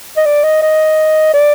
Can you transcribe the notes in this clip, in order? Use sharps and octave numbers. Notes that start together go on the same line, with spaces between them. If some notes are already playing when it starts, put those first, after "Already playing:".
D#5
D5
D#5
D#5
D5